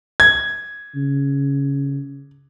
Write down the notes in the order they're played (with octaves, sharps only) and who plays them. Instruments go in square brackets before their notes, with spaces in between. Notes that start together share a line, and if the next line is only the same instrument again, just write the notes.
[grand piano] G#6
[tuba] C#3